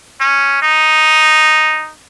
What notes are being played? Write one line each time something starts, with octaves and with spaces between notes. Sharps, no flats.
C#4
D#4